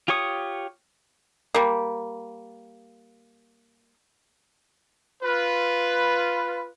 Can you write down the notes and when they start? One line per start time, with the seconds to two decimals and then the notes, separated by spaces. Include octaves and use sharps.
0.08 F4 G4 C#5 C#6 D#6
1.55 G3 A#3
5.23 F4 B4